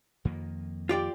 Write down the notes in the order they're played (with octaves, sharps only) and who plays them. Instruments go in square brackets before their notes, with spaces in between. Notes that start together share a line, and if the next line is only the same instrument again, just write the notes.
[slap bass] F2 D#3 A#3
[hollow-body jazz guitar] F4 G4 D5